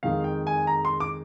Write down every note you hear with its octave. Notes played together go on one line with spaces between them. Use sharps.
F2 D#3 G#3 F5
G5
G#5
A#5
C6
D6